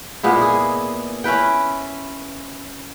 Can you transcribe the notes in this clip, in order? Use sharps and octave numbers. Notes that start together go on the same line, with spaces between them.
A#2 G#3 B3 E4
G#4
C#4 E4 B4 G5